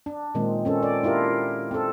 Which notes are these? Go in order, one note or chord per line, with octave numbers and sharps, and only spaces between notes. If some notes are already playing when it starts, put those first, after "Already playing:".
D4
A#2 D#3 G#3 C4
C4 C#4 A4
D5
D4 E4 F4 G4 A#4
C4 A4